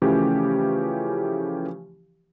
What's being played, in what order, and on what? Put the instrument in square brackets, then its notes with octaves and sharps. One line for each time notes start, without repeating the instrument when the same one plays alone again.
[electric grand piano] C#3 E3 F3 A3 C#4 G4